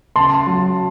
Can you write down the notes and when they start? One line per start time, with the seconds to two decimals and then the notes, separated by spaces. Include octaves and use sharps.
0.16 C#3 A5 C6
0.47 F#3